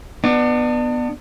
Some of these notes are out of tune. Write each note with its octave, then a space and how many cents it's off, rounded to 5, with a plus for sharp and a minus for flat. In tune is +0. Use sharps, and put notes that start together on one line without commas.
B3 +0 D4 +30